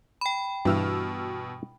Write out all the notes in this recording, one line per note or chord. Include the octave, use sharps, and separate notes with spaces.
G5 B5
G2 B2 E3 E6 F6